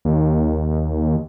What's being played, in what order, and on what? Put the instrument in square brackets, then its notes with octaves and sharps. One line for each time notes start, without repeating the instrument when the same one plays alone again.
[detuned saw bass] D#2